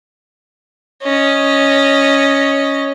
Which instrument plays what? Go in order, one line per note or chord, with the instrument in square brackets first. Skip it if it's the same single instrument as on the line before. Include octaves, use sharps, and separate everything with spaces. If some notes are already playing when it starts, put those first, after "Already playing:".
[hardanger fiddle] C#4 D#5